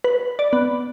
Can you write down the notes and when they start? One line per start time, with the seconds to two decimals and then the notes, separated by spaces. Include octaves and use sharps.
0.04 B4
0.39 D5
0.53 B3